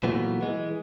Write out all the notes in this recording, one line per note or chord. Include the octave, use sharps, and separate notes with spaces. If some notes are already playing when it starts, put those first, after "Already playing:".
A#2 E3 F#3 A3 B3
E3 G#3